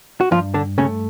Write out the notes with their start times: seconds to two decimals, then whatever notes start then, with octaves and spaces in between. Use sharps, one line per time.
0.21 F#4
0.31 G2 F3 F4
0.54 D3 D4
0.78 C#3 A3 C#4